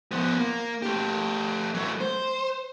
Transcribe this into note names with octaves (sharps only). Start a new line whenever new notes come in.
F3 B3
A#3
A3 G4
F#3 A3
C5